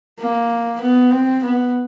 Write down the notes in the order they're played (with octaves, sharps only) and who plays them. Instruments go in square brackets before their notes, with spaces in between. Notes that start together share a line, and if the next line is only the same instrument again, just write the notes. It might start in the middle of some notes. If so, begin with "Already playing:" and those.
[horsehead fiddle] A#3
B3
C4
B3